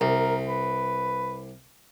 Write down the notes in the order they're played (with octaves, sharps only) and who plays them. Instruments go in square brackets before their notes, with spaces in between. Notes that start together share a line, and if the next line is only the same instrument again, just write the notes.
[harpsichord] C2 [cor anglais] A#4
[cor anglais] B4